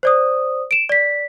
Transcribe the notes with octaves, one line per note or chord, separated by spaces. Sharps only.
C5 D5 D#6
D7 E7
D5 B6